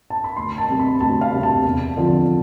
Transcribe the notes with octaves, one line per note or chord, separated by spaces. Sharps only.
A5
B5
D2 C6
A5
C3 G3 C4
B5
D2 A5
F5
C3 G3 C4
A5
E2
D3 F3 C4